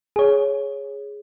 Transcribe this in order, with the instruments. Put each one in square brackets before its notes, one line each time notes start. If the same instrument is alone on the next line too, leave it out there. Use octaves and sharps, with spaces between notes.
[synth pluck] G#4 C#5